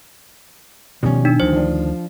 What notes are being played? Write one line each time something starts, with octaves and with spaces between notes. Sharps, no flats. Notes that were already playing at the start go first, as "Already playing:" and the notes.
B2 D#3 F3 G3 C#4
D4 D#4
D2 D#3 F3 C5
F3 D4